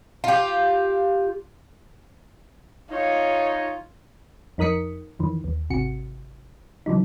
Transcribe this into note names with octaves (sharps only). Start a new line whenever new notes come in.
F4 G4
D#4 F4 C#5
F2 D#4 A#4 D#6 B6 C#7
F2 D#3 E3
D#2
G#1 C3 F#4 C#7
C#3 E3 F#3 D#4